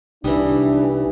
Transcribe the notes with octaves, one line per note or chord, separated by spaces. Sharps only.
C2 E3 G3 D4 D#4